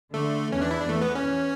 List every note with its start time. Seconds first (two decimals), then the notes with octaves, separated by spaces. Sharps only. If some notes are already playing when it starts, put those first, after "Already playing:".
0.13 D3 A3
0.52 E2 E3 C#4
0.62 D4
0.71 E4
0.80 D4
0.89 E2 E3 A3
1.01 B3
1.15 C#4